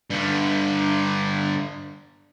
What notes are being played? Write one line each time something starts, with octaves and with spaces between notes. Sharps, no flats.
G2 D3